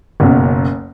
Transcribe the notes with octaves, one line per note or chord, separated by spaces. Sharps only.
F#1 B1 F#2